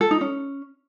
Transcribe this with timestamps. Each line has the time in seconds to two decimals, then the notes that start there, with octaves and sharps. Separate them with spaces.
0.01 A4
0.11 D#4
0.21 C#4